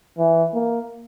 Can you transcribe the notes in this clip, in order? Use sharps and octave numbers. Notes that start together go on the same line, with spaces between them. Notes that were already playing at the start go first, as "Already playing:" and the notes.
E3
A#3